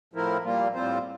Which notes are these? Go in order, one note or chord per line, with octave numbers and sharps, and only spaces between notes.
A2 F3 C4 E4 A#4
A#2 G3 A#3 F4
A2 G3 C4 F4 C5